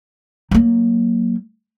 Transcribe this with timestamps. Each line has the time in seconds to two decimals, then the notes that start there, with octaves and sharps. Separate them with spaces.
0.51 F#3 A#3